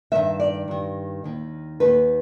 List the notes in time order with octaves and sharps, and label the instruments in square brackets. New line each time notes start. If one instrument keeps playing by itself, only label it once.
[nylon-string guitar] G2 D#3 E5
D5
G2 D#3
D#2 D#3
D#2 D#3 B4